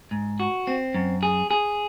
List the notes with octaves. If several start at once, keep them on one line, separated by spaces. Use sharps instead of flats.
G#2
F#4
C4
F#2
G#4
G#4